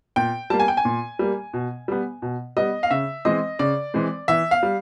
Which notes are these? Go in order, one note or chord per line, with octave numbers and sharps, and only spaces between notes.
A#2 G5
G3 A#3 A5
G#5
G5
G#5
A#2
G3 A#3
B2
G3 B3
B2
G3 B3 D#5
F5
C#3 E5
E3 G#3 C4 D#5
C#3 D5
E3 G#3 C4
E3 E5
F5
G3